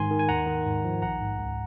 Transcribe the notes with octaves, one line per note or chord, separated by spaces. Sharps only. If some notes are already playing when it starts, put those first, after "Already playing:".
Already playing: G#2 D#3 G#5 C6
D#3
G#5
D#2 F#5 A#5
D#3
G#2
F3
A#1 F#5 A#5
G#2
C#2